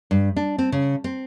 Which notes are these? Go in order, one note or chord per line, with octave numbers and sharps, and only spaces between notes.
G2
D4
C4
C#3
C4